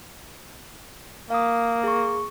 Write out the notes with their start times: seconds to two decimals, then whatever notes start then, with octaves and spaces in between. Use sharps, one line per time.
1.30 A#3 F5 D#6
1.84 G#4 C#6